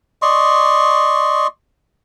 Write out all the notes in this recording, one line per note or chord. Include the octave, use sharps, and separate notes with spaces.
D5 D#5 C6 C#6